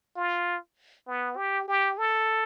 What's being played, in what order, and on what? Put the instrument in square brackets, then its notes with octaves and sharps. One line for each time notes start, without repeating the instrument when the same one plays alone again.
[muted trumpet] F4
B3
G4
G4
A4